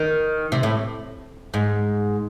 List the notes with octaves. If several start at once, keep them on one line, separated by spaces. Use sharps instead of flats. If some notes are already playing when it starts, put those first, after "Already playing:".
Already playing: D#3
C3
A2
G#2